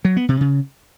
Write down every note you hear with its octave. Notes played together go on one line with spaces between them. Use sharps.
F#3
B3
C3
C#3